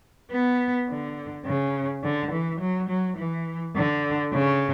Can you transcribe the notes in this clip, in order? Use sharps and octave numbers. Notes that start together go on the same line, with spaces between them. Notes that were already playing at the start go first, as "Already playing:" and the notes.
B3
D3
C#3
D3
E3
F#3
F#3
E3
D3
C#3